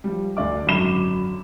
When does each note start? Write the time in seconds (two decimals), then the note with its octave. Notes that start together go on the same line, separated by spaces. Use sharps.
0.04 F3 G3
0.37 D2 D4 D5 D6
0.67 G#1 F#2 D3 F#3 B5 E7